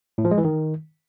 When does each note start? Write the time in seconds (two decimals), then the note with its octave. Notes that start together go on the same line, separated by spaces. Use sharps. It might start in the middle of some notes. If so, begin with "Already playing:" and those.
0.18 A2
0.25 F3
0.31 G#3
0.38 E3
0.44 D#3